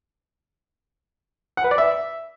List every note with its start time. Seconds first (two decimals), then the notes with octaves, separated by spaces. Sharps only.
1.57 F#5
1.64 B4
1.71 D5
1.78 E5